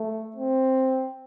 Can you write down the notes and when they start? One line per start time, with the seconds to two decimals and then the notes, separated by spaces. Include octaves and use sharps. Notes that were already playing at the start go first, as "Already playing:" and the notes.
Already playing: A3
0.36 C4